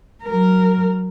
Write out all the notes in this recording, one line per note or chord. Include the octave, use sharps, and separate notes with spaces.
F#3 A#4